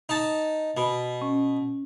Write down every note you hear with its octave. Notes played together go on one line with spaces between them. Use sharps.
D#4 A5
B2 B5
C#4